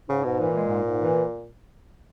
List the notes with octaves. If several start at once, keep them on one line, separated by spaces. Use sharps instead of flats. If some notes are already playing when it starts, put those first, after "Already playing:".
G#2 C#3
G#2 B2
A#2 E3
G#3
G#2
G#2
E3